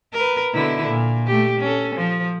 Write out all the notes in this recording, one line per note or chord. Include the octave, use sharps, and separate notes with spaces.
A#4 B4
B2 D3 E4
A#2
A3 G4
C#4 A4
F3